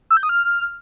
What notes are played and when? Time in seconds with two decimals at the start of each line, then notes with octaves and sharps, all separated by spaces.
0.11 E6
0.17 G6
0.23 D#6
0.29 F6